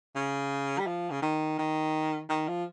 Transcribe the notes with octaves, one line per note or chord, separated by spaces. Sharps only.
C#3
G3
F3
C#3
D#3
D#3
D#3
F3